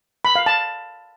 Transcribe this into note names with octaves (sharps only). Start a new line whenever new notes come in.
B5
F5
A5